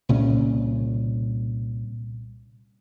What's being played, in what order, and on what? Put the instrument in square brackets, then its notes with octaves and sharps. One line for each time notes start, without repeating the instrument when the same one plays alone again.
[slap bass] C2 A#2 C#3 C#4